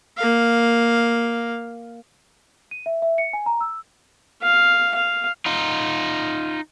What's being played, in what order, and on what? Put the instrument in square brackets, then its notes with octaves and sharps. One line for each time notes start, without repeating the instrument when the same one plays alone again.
[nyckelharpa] A#3 F5
[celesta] D#7
E5
E5
C#7
G#5
A#5
E6
[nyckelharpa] F5
F5
[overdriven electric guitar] D#4 F4